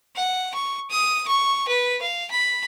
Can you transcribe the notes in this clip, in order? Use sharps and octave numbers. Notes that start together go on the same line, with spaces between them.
F#5
C#6
D#6
C#6
B4
F5
B5